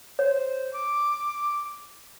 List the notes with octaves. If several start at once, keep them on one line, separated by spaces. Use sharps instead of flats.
C5 C#5
D6